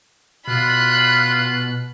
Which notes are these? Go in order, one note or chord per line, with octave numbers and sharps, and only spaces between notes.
B2 F4 B5 F#6